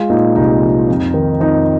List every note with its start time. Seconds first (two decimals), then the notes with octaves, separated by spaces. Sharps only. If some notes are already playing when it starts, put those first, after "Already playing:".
Already playing: G#3 F4
0.10 A#2 D#4
0.36 C2 D#4
0.62 F3
0.88 F2
1.14 D#3
1.40 F2 D#4